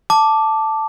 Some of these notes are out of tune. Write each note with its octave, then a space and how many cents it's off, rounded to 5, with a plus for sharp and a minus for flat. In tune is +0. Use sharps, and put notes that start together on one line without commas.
A5 +0 D6 +0